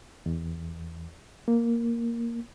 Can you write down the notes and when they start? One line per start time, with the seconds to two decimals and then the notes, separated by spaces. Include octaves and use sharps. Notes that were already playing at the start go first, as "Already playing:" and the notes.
0.26 E2
1.48 A#3